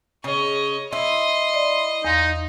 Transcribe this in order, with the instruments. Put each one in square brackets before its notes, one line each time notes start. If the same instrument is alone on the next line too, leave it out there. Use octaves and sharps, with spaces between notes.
[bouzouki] C#3 [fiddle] C#5 D#5
[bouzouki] E4 [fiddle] D#5 [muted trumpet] C6
[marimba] D5
[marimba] E2 F5 C6 [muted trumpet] D#4